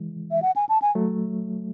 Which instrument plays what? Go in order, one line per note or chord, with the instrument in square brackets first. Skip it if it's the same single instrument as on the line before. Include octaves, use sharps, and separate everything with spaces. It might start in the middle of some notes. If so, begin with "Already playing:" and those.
Already playing: [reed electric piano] E3 G#3
[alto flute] E5
F#5
G#5
A5
G#5
[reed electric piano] F#3 A3